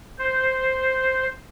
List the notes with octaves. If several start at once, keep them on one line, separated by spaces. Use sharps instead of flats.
C5